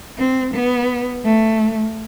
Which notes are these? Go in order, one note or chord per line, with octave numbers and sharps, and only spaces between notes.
C4
B3
A3